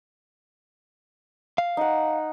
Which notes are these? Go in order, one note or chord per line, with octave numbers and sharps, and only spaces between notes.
F5
D#4 F#5